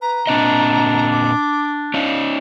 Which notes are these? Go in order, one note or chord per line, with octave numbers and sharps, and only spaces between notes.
B4 A#5
A#2 C4 D4 D#5
D6
C#4 D#4 F5